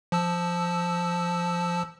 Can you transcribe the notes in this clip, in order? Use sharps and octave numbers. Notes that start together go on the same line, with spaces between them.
F3 A5 E6